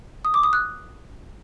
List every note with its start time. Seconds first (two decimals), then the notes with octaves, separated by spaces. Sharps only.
0.25 D#6
0.34 D6
0.43 D#6
0.53 F#6